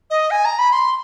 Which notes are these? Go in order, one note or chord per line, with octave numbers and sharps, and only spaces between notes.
D#5
G#5
A#5
B5
C6